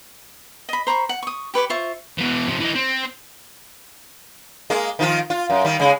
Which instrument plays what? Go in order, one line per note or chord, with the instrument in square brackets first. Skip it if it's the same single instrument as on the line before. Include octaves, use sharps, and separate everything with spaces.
[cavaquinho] D#5 B5
C5 A#5 B5 C#6
F#5
C#6 D#6
G4 B4 C#5 D6
F4 C5 E5 C#6
[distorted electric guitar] B2 E3
C3 F3
E3 D#4
C4
[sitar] G#3 A#3
D#3 F3 F4
F4
F#2
D#3 G3
C#3 G#3